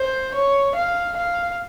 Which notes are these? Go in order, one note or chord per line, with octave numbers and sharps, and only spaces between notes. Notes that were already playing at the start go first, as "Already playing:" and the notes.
Already playing: C5
C#5
F5
F5